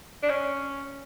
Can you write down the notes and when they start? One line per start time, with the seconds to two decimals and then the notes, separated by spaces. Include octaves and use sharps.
0.23 D4
0.30 C#4